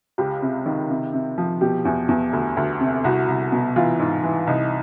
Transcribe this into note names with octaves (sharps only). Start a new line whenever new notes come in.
C#2 G4
C3
D#3
C3
C3
F3
B2 G4
E2
E2
D2
D2
C3
C2 F#4
C2
B2
E3 F4
G#2
E3
C2 D#4